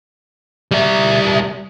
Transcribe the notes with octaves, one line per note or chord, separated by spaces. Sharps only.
G3 E5